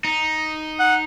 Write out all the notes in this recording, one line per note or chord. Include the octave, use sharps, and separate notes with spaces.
D#4
F#5